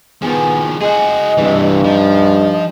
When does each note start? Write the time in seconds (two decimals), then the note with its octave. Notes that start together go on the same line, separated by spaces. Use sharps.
0.22 D#3 F3 B3 G#4
0.81 G#3 F#4 G#4 D#5 G5
1.38 G2 C3 E3
1.84 F3 D#4 G4 D#5